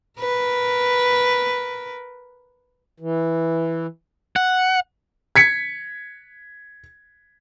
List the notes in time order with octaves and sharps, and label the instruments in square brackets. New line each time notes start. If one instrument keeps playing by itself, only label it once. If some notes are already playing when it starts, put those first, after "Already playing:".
[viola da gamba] A#4 B4
[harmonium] E3
[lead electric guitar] F#5
[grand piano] G#6 B6 C#7